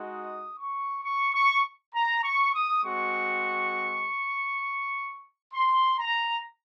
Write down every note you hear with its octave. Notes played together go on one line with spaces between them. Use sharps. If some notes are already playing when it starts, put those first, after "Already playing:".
Already playing: G#3 D#4 F#4
D#6
C#6
C#6
C#6
A#5
C#6
D#6
G#3 C4 F#4 C#6
C6
A#5